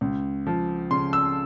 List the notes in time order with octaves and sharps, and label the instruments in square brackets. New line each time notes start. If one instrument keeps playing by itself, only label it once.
[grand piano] C#2
F3
C#3 C6
E6